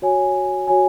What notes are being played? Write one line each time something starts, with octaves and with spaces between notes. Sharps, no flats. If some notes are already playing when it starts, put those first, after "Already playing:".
F#4 C#5 G#5
F#4 C#5 G#5